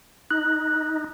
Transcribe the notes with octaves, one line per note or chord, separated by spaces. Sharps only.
D#4 F#6